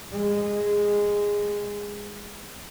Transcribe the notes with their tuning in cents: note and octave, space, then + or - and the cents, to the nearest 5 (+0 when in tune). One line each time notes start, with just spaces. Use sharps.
G#3 -15